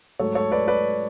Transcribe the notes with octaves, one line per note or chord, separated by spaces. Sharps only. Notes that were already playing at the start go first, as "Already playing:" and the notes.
G#2 F#3 A3 A4 C#5
A4 C#5
B4 D5
B4 D5